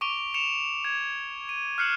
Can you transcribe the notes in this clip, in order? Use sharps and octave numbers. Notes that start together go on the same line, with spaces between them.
C#6 D6 D7 F7 G7
C#7 E7 F7
G#6
D#7
F6 F#6 C7 C#7 E7 F#7